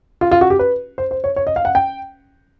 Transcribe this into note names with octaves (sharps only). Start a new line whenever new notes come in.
F4
F4
F#4
G4
B4
C5
C5
C#5
C#5
D#5
F5
F#5
G5